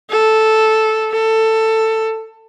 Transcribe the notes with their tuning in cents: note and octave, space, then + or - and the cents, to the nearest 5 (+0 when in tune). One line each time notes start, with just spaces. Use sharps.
A4 -5
A4 +15